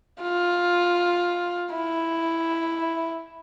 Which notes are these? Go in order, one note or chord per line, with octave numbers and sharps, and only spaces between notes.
F4
E4